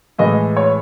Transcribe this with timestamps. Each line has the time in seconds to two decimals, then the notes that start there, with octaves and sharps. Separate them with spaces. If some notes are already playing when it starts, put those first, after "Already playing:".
0.18 A2 E3 G#3 D#5
0.57 C#5